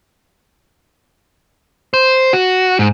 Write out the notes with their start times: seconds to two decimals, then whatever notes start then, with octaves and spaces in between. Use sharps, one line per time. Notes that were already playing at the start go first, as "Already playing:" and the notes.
1.94 C5
2.33 F#4
2.79 G#2